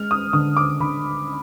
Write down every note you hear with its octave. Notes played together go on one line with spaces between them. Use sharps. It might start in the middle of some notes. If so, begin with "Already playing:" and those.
Already playing: G#3 F6
D#6
D3 D#6
D6
D3 B5